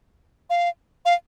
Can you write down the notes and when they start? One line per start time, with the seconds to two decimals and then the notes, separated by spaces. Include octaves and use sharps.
0.50 F5
1.05 F5